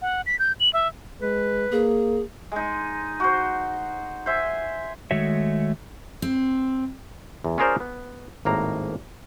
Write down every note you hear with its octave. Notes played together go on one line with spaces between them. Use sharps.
F#5
B6
G6
F#7
E5
G#3 B4
A#3 G#4
G#3 D#4
F#4 C5
C5 E5 G#5
D#3 G#3 A3 F#4 C#5 E5
C4
E2
C#4 F4 G#4 A#4 C5 D5
B3
G#1 A2 A#3 A#5